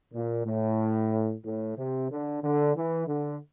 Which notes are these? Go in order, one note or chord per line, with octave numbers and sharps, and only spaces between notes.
A#2
A2
A2
C3
D3
D3
E3
D3